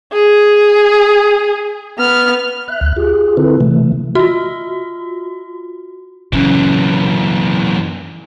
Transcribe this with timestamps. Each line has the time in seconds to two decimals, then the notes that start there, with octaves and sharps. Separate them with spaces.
0.13 G#4
1.99 B3 F6
2.68 E5 F#6
2.81 D2 F#6
2.97 F4 G4 G#4
3.37 D3 C4 E4 A4 B4
3.61 C3 E3 A3
4.15 F4 F#4
6.33 F#2 C#3 E3